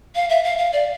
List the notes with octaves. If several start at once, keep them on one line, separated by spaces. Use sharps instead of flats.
F5
E5
F5
F5
D5